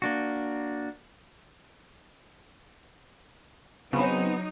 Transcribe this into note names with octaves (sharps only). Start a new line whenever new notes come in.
A#3 D4 F#4
C#3 F#3 B3 C4 D#4 G#5 B5 E7